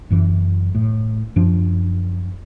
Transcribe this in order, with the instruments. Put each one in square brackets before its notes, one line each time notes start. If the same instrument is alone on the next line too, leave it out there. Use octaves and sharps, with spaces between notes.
[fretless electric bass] F#1 F#2 E3
A2
F#2 F3 D4